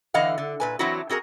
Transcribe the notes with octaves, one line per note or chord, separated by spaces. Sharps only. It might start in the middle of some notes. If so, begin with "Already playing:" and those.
D3 E3 D#5 F5 F#5
D3
A#2 B4 G#5
E3 F#3 C4 D4 E4 F#4
C4 F#4 G#4 A#4